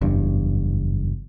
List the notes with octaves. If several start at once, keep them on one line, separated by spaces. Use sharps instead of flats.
F#1 E2 G2